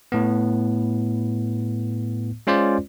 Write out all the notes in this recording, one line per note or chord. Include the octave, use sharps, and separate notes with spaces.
A2 B3
G#3 C#4 F4 C5 D5